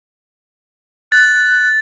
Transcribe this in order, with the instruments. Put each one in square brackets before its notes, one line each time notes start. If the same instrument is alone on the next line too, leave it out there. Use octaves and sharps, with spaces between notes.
[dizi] F#6 [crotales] A6